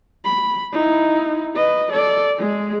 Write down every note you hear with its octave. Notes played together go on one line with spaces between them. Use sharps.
B5
D#4 E4
B4 D#5
A4 D5
G#3 G#4